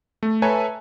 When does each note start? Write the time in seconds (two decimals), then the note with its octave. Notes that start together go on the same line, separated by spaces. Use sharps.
0.23 A3
0.42 A4 B4 C#5 E5 G#5 A#5